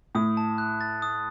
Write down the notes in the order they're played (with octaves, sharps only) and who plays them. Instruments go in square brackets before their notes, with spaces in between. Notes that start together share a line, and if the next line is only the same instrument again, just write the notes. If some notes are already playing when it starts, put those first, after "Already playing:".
[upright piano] A2 [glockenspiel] D#6
[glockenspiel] A5
F#6
A6
D#6